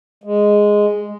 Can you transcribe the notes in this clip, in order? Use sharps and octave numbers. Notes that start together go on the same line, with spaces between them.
G#3